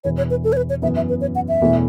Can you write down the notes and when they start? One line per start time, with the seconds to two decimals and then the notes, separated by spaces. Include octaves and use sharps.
0.04 E1 E2 E3 C#5
0.18 C#5
0.30 B4
0.44 A4
0.52 C#5
0.57 B4
0.70 C#5
0.82 F#2 E3 B3 E5
0.96 E5
1.09 B4
1.21 C#5
1.35 F#5
1.48 E5
1.61 E1 E2 B2 A3 E4